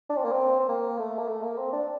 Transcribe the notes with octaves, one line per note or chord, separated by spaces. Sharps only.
D4
C4
A#3
C4
C4
A#3
A3
A#3
A3
A#3
C4
D4